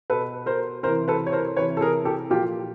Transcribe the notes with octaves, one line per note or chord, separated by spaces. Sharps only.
B2 A4 B4
A#4 C5
C3 E3 A#4 C5
A4 B4
C#5
A#4 C5
C3 E3 B4 C#5
A4
G#4 A#4
G4 A4
A#2 F3 F4 G4